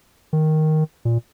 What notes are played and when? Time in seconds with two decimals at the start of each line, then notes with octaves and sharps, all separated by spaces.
0.33 D#3
1.05 A#2